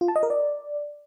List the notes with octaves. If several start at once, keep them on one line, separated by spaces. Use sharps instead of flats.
F4
A5
D#5
A#4
D5